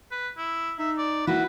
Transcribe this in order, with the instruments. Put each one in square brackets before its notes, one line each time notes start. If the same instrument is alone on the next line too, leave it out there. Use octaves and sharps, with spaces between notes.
[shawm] B4
E4
[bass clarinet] D#4 [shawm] E5
[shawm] D5
[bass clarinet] A#3 [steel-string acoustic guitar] E4 F#4 [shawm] B4